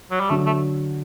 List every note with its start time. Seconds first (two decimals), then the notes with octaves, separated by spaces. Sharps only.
0.11 F#3
0.20 G3
0.30 D3 F#3 A3
0.46 A3